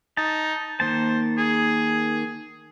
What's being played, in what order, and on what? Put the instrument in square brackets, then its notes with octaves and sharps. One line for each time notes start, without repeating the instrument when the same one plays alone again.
[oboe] D#4 [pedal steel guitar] A5
[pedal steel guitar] D#3 A#3 A5 [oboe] C5
[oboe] G#4